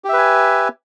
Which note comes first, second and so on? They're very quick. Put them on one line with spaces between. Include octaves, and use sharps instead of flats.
G4 E5 B4 G#5